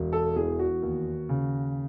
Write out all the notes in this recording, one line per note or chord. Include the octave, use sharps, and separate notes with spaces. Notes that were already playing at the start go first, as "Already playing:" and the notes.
Already playing: E1
A4
E2 G#4
F#4
D#2
C#3